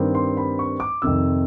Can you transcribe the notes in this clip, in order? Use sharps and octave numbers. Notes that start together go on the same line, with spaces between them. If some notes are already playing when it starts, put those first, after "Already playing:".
Already playing: G2 D#3 G3 C4
C6
B5
C#6
D6
F2 C3 D#3 E6